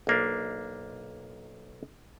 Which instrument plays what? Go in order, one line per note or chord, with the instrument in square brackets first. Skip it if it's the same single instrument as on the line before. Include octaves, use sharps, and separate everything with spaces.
[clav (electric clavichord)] B1 A#3 D4